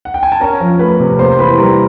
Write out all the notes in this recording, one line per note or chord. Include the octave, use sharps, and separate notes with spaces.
F#5
G5
G#5
A5
C#4 A#4 A#5
F3
A3 B4 B5
C3
A#3 C5 C6
E3 B4 B5
G3 A#4 A#5